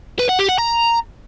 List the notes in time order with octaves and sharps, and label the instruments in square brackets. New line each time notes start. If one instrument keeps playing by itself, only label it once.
[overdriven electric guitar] B4
F#5
G4
F#5
A#5